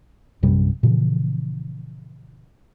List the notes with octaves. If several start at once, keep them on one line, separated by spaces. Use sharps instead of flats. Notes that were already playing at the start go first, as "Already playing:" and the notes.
A#1 F#2 C3 G3
A#2 C#3 E3 F3